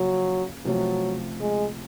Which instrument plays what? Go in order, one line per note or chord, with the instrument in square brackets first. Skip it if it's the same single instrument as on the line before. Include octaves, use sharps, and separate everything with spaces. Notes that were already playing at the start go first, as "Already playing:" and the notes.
Already playing: [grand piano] C#3 F3 A#3 [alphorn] F#3
[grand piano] C3 F3 A3 [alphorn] F#3
[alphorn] G#3